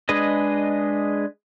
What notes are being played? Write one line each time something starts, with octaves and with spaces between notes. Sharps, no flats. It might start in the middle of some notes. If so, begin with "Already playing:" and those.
G#3 D4 G#4 B4 D#5